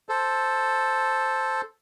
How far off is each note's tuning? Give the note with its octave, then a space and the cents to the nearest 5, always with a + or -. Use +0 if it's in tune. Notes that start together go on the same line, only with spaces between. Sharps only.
A4 +0 C5 +5